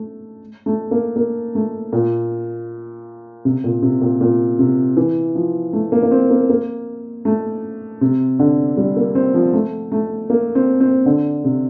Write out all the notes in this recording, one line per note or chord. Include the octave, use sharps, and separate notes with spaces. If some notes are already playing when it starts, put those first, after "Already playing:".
Already playing: A3
A3
A#3
A#3
A3
A#2
C3
A#2
C3
A#2
A#2
C3
E3
F3
A3
A#3
A#3
C4
A#3
A#3
A3
C3
D3
G3
A#3
C4
F3
A3
A3
A#3
C4
C4
D3
C3